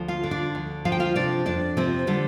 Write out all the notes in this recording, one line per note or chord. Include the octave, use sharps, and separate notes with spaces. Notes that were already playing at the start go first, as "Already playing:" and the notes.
Already playing: D2 F3
F4 F5
D3
D4 D5
D2
F3 F5
G5
F4 F5
C3 D4 D5
F2 D4 D5
C3 F3 C4
D3 G3